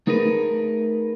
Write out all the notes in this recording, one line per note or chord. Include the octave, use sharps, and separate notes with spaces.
A3 D#4 G#4 A#4 B4